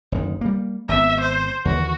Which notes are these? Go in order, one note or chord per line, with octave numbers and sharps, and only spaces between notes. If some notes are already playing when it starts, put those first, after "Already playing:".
F#1 D2 D#3
G3 A#3
G#1 B3 E5
C5
D#2 D3 E3 F#4